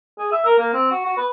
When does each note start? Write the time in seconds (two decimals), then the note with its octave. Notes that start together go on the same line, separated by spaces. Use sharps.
0.18 G#4
0.32 E5
0.45 A#4
0.58 A#3
0.73 C4
0.91 F#4
1.06 F#4
1.17 B4